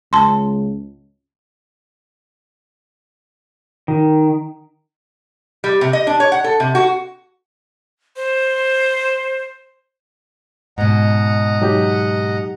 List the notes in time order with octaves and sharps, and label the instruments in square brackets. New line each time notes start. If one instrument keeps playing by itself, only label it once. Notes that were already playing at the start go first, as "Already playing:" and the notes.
[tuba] C#2 [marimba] A5 C6
[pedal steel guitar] D#3
[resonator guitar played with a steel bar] G3
C3
D#5
D4
C#5
F#5
A4
C3
F#4
[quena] C5
[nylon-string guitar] G#2 B2 [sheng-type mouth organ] D#5 F#5 A#5
[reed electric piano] F#3 D#4 G4